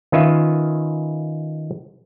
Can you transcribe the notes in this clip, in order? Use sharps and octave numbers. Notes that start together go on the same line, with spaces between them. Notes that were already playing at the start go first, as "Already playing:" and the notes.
D#3 C#4 F4 B4 E5